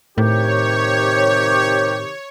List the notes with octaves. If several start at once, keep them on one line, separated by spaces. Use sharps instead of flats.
A2 C3 D#3 G4 C#5